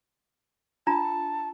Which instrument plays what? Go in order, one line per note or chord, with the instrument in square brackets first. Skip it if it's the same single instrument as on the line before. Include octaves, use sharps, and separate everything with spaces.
[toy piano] D4 F4 A#5 [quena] A5